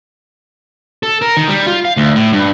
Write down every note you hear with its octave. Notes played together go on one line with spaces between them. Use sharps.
A4
A#4
D#3
G3
F4
F5
D2
A2
G2